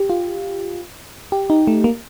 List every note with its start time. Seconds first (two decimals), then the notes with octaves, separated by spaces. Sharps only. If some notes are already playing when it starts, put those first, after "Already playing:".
Already playing: G4
0.10 F4
1.32 G4
1.50 D#4
1.67 A3
1.84 A#3